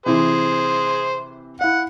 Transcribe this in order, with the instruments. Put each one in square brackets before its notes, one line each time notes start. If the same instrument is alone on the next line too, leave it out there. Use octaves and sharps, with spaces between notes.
[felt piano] C3 E3 [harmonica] G#4 C5
[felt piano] E4 F5 [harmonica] F#5